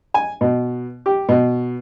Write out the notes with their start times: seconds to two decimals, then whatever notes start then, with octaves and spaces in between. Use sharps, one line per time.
0.14 G#5
0.41 B2
1.06 G4
1.29 B2